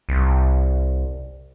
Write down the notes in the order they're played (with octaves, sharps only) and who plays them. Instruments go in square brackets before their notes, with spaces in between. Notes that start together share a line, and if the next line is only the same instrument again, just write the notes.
[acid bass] C2